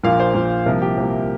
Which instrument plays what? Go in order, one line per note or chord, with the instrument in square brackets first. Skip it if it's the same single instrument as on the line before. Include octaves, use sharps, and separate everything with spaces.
[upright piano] A#1 A#2 A#3 F5
C5
A#1 A#2 A#3
C2 C3 F3 A#3 A#4
G4
C2 C3 F3 A#3